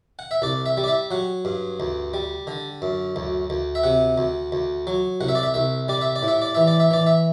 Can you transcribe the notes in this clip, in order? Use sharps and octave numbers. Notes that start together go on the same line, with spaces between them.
F#5
E5
C2 D5
E5
G3
D5
E5
F#3 F#5
G2
D2
G3
D3
F#2
D2
D2
E5
C3 F#5
D2
D2
F#3
C2 F#5
E5
D5
E5
C2 E5
G3 D5
E5
D5
A2
E5
D5
E3 E5
D5
E5
E3 D5
E5